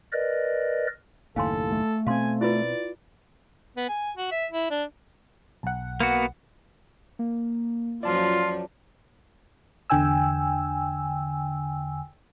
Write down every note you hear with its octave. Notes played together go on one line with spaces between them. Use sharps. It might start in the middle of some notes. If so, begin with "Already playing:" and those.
A#4 B4 D5 D#5
F#1 D#2 A2 A4 F5 G#5 C6
A3
B2 C4 F5 G#5 C6
E4 F4 B4 D5
B3
G#5
F#4
E5
E4
D4
B1 F#5
A#3 B3 F#4
A#3
F#2 F3 F#3 F4 D5 A5
E2 D3 G5 G#5 E6